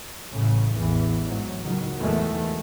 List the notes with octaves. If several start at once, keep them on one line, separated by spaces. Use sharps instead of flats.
A1 A2 C#3
A1 E2 E3
G#2 E3 F#3
C#2 D#3 F#3
E2 B2 D#3 G#3 A3